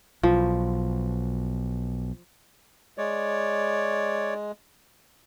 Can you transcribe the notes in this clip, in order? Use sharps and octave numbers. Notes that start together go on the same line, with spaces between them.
B1 F3
G#3 C#5 D5